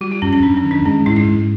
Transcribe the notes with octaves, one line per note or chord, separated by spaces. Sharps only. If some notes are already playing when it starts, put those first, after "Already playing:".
G3 F#4
F4
F#2 C#4
C#4
F#2 D4
C#4
D#3
D4
G#3 C#4
G#2 E4
D#4
G#2